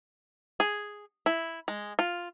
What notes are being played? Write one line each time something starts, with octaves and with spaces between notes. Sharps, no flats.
G#4
E4
G#3
F4